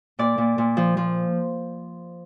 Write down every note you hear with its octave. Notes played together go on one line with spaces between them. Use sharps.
A#2 D5
A#2
A#2
F3
F3